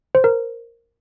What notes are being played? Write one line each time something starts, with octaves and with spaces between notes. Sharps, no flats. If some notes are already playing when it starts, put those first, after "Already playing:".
C5
A#4